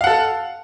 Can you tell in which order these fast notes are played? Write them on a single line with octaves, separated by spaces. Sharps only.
F5 F#5 A4